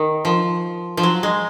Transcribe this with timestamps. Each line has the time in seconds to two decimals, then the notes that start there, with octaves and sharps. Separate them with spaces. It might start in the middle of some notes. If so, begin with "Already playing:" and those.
Already playing: D#3
0.25 F3
0.97 F3
1.03 F#3
1.23 G#3